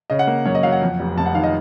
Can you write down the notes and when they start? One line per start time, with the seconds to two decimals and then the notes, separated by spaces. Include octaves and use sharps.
0.10 C#3 D#5
0.19 F#5
0.27 A#3
0.45 F#2 C#5
0.55 D#5
0.63 F#3 F5
0.72 F#5
0.82 F2
0.99 F1
1.17 F1 A5
1.26 F#5
1.34 D#3 F5
1.43 D#5